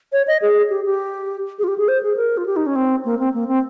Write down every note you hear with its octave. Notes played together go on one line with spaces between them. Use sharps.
C#5
D#5
G#4
G4
G4
G#4
F4
G4
G#4
C5
G#4
A#4
F4
G4
D#4
C#4
C4
A#3
C4
A#3
C4